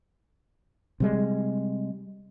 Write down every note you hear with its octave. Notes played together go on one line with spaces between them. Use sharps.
C3 G3 G#3